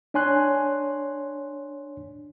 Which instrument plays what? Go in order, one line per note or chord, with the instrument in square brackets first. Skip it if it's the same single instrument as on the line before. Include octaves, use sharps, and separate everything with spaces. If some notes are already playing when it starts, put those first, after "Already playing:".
[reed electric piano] D4 C#5 G#5 C6 F#6